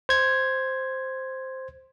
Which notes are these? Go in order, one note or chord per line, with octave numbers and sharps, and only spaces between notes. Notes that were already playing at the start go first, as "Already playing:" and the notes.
C5 G#6